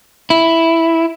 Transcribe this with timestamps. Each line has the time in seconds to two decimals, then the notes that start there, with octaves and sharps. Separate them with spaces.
0.30 E4